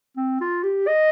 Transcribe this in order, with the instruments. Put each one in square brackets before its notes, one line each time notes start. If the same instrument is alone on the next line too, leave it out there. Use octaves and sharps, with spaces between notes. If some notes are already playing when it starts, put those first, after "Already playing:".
[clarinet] C4
F4
G4
D#5